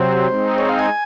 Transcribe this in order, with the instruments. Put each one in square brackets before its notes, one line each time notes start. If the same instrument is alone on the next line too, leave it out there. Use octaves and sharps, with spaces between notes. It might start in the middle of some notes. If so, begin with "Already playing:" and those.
Already playing: [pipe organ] C3 F#3 C4 [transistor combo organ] C5
[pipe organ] G#3 C4 D#4
[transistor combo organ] C#5
F5
G#5